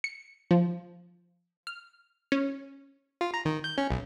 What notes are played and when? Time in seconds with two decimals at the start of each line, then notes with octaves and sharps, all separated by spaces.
0.04 C#7
0.51 F3
1.67 F6
2.32 C#4
3.21 F4
3.34 A#5
3.45 D#3
3.64 G6
3.78 C#4
3.91 B1